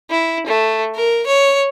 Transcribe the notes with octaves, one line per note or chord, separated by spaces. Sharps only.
E4
A3
A#4
C#5